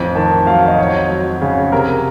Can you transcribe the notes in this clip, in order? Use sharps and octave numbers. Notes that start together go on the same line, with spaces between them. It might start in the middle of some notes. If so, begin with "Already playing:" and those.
Already playing: A1 F2
D#3 A5
F#3 F5
D#5
F2 C#5
F#3
C#3
C3 A#4